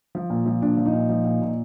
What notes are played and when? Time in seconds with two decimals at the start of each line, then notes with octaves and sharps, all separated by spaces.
0.15 F3
0.30 A#2
0.46 F3
0.62 A#2 D4
0.77 F3
0.86 D#4
0.93 A#2
1.09 F3
1.25 A#2
1.42 A#2